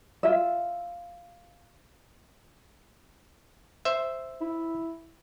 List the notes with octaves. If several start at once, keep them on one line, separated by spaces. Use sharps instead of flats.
F4 E5
C5 E5
E4